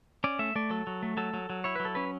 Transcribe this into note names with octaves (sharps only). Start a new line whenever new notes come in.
C#4 D5
A3 E5
A3 D5
F#3 A4
F#3
A3
F#3 A4
F#3
F#3
E4 C#5
F#3 B4
A4
C#4 B4